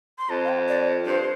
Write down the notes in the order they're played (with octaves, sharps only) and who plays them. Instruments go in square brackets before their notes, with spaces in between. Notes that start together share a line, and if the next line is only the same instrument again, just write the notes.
[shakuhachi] C6
[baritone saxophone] F2 [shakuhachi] A5
[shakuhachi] F5
G5
D5
[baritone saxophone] G2 [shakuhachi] C5